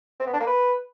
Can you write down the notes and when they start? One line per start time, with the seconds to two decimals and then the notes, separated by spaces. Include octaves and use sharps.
0.20 C4
0.26 B3
0.33 D4
0.40 A#3
0.47 B4